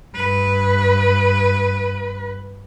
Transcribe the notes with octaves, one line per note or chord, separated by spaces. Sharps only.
G2 B4